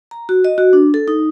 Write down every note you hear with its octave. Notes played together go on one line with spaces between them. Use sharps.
A#5
F#4
D#5
F#4
D4
A4
D#4